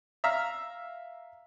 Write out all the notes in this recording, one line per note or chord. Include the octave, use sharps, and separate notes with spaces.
E5 F5 A#5 E6 F6